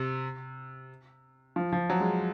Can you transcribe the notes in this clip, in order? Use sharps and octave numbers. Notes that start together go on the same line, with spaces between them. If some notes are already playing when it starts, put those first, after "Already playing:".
Already playing: C3
F3
F3
F#3
G#3